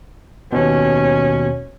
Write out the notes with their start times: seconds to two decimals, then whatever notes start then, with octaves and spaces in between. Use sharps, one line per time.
0.52 D#2 B2 C#4